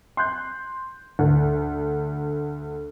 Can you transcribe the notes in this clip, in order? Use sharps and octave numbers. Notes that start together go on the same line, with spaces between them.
C6 F#6 G6
D2